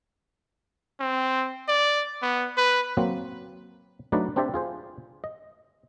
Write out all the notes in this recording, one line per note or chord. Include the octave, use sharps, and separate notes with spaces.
C4
D5
B3
B4
F#3 A#3 C4
F#3 A3 D4 D#4 B4 D5
C4 D4 G4 C5 D5 E5
F4 G#4 C5
D#5